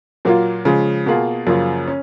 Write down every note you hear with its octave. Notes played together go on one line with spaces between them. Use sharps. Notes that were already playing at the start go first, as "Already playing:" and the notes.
A#2 F#3 A#3 F4
C#3 F3 G#3
B2 A#3 F4 G#4
F#2 C#3 F3 A#3 F4
C#4